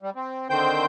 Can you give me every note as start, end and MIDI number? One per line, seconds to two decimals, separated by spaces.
0.02 0.10 55
0.16 0.48 60
0.50 0.86 50
0.50 0.86 51
0.50 0.86 60
0.50 0.86 72
0.50 0.86 79
0.50 0.86 91